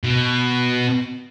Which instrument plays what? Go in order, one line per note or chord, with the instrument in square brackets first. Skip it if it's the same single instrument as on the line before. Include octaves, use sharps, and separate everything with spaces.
[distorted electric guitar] B2